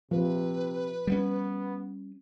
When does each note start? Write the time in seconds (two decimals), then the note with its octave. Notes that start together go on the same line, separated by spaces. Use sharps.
0.11 C3 F3 B4
1.07 G3 A#3 B3 C#4